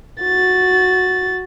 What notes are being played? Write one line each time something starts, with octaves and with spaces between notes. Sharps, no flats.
F#4 A6